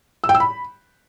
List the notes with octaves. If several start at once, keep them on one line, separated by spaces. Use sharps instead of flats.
E6
G5
E6
B5